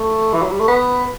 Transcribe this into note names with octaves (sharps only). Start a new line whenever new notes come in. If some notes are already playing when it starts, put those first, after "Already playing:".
Already playing: A3
E3
F#3
G3
A3
B3